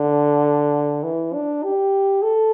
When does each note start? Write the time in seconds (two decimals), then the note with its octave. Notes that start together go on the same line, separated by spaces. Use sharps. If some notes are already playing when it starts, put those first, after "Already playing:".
Already playing: D3
1.04 E3
1.34 D4
1.64 G4
2.22 A4